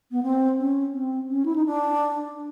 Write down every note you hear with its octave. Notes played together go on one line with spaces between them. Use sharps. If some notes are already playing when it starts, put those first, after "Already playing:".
B3
C4
C#4
C4
C#4
E4
D#4
D4